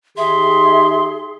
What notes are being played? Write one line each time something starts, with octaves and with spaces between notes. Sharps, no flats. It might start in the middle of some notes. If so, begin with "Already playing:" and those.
D#3 D#4 G4 G#4 E5 C6